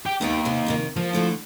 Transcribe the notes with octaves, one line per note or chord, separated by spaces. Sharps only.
G4 G5
D#2 B3 D#4 G5
C3 C4
F2 C3 D#3
F3 A#3
D3 A3 E4